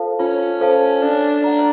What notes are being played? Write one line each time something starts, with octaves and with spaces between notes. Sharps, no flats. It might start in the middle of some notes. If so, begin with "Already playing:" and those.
Already playing: F4 A4 C5 F5 A5
C#4 F4
A4 C5 F5 A5
D4 A4
D5 F#5 A#5